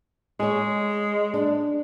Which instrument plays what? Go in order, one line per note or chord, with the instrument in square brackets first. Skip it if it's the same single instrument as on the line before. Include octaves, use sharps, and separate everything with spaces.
[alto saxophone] G#3 [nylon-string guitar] G#4 C#5
[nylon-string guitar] D4